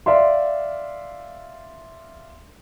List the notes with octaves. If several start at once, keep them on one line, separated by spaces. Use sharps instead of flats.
D5 E5 F5 C6